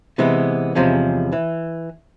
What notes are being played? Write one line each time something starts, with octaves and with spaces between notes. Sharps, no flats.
C3 E3 G#3 B3
E2 C3 F3 G#3 C#4
E3